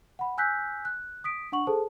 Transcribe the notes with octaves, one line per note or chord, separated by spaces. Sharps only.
F#5 B5
G#5 E6 F#6 G6 B6
F#6
D#6 B6 D7
D4 F#5 C#6 F#7
G#4 A4 C5 A5